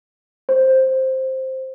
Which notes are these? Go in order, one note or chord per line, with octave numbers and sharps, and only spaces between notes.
C5